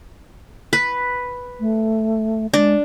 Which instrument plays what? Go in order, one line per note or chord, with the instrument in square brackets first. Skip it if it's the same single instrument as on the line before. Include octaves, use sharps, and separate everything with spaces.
[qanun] B4
[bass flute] A3
[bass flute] G#3 [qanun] D4